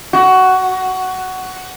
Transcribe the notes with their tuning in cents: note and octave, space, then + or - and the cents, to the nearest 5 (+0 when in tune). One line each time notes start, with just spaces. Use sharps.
F#4 +10